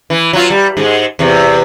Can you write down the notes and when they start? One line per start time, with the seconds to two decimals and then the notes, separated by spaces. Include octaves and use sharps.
0.10 E3
0.33 F#3 F4
0.50 G3
0.77 G#2 G#3
1.19 E2 C3